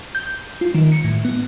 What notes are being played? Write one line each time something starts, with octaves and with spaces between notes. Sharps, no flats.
G6
F4
D#3
C#7
A2
B3